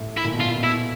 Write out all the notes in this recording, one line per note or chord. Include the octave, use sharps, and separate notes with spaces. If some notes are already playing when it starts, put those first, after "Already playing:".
Already playing: A2
E4
A#2
B2
A#2 F4
B2
E4